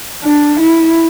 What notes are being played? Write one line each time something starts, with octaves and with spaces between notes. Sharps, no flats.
D4
E4